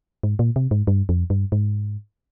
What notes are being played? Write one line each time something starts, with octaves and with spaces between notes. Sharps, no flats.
G#2
A#2
C3
G#2
G2
F2
G2
G#2